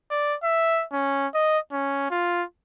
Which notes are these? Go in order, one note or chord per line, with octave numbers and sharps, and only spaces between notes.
D5
E5
C#4
D#5
C#4
F4